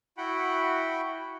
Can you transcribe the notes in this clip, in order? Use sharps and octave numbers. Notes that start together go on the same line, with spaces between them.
E4 F#4 F#5 G5 B5